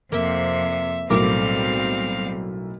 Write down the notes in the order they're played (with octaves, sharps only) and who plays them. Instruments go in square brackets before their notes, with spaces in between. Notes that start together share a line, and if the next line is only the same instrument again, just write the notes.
[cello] F2 C3 [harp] A#3 [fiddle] E5
[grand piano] B1 A2 A3 [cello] G3 C4 [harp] A#4 D6 [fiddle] F5